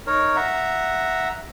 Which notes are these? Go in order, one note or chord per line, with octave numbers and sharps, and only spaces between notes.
D#4 A#4 C#5
E5 F#5 A#5